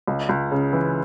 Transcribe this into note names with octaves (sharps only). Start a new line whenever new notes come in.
C#2
C#2
C#3
E3